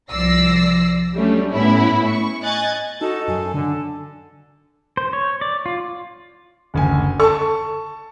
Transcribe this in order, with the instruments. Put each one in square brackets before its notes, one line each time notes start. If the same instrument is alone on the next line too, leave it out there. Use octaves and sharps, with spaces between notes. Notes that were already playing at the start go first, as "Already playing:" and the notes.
[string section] C2 F3 D5 E6 A#6 C7
F#3 G3 A3 C#4 D4
A2 B3 C#4 E4
C#6
D#5 G#5 F#6 G#6 A6
[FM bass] D#4 [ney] F#4 [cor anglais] A4
[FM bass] F#2 [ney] G#5
[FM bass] D3 [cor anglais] A4
[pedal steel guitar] C5
C#5
D5
F4
[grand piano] F#1 D2 G#5
[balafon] A4 [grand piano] A5 C#6